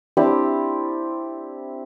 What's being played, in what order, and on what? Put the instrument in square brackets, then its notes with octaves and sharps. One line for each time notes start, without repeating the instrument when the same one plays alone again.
[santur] C4 D4 E4 G4